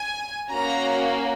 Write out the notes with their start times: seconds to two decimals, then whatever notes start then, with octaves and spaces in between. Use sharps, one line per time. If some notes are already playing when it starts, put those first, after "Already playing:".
Already playing: G#5
0.49 A#3 C#4 F#4 A#5